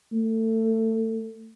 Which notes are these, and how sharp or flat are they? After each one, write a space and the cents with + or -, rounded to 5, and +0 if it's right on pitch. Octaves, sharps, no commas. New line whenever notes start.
A3 +25